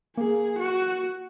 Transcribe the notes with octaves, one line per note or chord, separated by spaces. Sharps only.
A#3 G#4
F#4